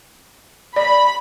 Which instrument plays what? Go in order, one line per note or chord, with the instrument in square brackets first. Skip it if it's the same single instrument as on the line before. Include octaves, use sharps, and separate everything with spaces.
[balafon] D5 [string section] B5